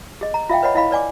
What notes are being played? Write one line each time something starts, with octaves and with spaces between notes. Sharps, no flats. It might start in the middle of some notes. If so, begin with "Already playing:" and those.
G#4 D#5
A#5
F4 E5 F5 G5
B4 C#5 D#5 F#5 B5
E4 D#5 F5 B5
B4 D5 G#5 D6